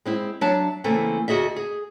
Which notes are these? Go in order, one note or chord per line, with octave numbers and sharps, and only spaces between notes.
G#3 C4 E4
F#3 D4 E5 A5
C#3 E3 A3 A#3 C4
D2 F#4 G#4 D#5 E5
G#4